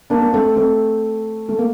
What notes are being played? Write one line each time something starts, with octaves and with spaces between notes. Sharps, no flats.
A#3 D4
A#3
A3 C4
A3 C4
A3
A#3